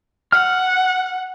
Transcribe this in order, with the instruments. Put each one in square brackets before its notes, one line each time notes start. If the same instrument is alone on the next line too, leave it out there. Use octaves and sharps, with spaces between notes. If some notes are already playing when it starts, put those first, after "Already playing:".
[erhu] F#5 [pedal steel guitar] F6